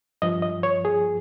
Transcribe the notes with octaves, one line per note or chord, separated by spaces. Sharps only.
G2 F3 D#5
D#5
C#5
G#4